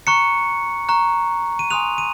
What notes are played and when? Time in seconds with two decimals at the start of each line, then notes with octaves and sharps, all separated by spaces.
0.07 A#5 C#6 F#6 C#7
0.89 A#5 C#6 F#6
1.59 D#7
1.70 G#5 C6 D#6 F#6 F7
1.98 D#7